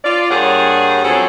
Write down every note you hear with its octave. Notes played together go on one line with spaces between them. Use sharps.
F4 D5
G2 G3 A#3 G#4 C#5 F#5
F3 F#3 C4 C#4 G#4 A4